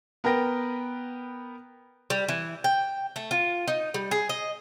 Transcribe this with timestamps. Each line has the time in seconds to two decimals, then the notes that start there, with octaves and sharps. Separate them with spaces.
0.24 B3 A#4 B4 G5 A#6
2.10 G3
2.29 E3
2.64 G5
3.16 A3
3.31 F4
3.68 D#4
3.94 G3
4.11 G#4
4.29 D#5